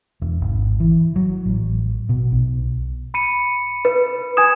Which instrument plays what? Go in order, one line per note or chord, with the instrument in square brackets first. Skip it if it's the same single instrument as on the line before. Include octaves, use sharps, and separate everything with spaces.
[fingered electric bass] E1
G#1
E3
F#3
A1
B2
B1
[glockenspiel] B5 C#7 D#7
[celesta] B4
[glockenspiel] G#5 G#6 E7 [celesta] D#6